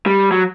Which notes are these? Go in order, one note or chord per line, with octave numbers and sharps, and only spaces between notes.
G3
F#3